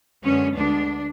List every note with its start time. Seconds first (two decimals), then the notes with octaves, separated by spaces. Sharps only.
0.24 F#2 D3 G#3 B3 C#4
0.56 D2 D3 G#3 B3 D4